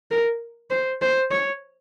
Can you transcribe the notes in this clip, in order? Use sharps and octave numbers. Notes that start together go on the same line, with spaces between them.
A#4
C5
C5
C#5